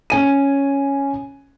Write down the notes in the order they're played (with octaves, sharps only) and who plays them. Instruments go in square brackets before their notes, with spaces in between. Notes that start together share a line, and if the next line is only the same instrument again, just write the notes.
[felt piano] C#4 G#5 D#7